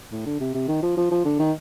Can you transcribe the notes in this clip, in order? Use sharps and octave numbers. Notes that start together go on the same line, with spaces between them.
A2
D3
C3
C3
D#3
F3
F3
F3
D3
D#3